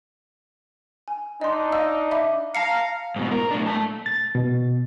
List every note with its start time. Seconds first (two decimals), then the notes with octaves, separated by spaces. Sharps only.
1.08 G#5
1.41 D4 D#4 D#5 C6
1.72 D#5 F5 E6
2.11 E5 B5 D6
2.55 F5 A5 A#5 C7 C#7
3.16 G#2 B2
3.31 A#4
3.51 A2 D4
3.67 A3 A5
4.06 A6
4.35 B2